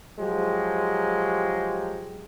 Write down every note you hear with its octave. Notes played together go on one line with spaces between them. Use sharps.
F3 F#3 G#3 G4